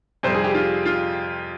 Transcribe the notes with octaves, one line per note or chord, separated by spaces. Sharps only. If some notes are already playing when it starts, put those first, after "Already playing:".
F2 C3 G3 C5
G#4
G4
F4
F4